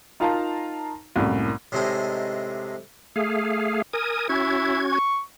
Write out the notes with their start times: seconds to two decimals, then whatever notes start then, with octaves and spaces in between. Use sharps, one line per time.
0.20 D#4 F4 A#4 F5 A5 A#5
1.16 C2 F#2 A2 A#3
1.72 A2 C3 G#3 D4 D#4
3.16 A3 G#4 F5
3.93 A#4 G#5 D#6
4.29 C#4 E4 F#4 G#6
4.92 C#6